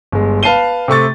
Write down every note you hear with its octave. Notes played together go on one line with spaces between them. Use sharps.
G1 G#3
B4 F5 A5 C7 D#7 G7
C3 A3 C#6 A6